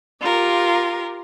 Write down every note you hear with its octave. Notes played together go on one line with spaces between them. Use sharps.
F4 G4 A#4